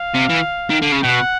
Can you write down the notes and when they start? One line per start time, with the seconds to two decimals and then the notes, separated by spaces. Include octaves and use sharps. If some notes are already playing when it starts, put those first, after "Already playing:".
Already playing: F5
0.15 C3
0.30 E3
0.70 D#3
0.82 D3
0.92 C#3
1.03 B2 F#5